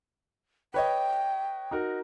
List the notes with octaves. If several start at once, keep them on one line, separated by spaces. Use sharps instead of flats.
B4 C#5 D#5 G5
D#4 F#4 A#4